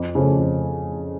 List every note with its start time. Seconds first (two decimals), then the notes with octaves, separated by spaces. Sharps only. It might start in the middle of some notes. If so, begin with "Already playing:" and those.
Already playing: F2
0.15 C#3 F3 A3 C#4
0.38 F2